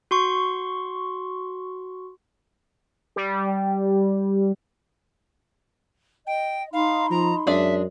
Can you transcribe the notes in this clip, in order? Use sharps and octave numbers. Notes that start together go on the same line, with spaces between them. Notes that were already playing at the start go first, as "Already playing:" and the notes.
F#4 C6 C#6
G3
D#5 G5
D#4 F5 B5 C6
F3 A#5
F#2 G#3 D4 D5 E5